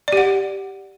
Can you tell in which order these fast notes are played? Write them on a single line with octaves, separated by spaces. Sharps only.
D5 G4 F#5